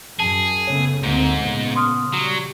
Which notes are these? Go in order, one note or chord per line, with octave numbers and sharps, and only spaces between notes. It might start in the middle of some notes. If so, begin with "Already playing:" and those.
F#2 G#4 A5
C#3 A3 B3 C#5
D2 G#2 A#3 C4
A#2 C#3 B3
C6 D#6 F6
F#3 G3